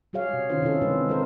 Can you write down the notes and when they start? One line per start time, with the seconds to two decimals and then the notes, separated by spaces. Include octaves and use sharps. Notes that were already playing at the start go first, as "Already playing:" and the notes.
0.13 G3 F#4 G#4 C#5 F5
0.33 C3
0.50 D#3 C#4 D#4 F4 C5
0.62 C3 C#4 E4 F4 A4
0.82 E3 F3 G#3 C4 D4 B4
1.08 G3 C4 A4 A#4 C5